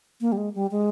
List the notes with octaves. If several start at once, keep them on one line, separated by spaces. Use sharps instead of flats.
A#3
G3
G#3
G3
G#3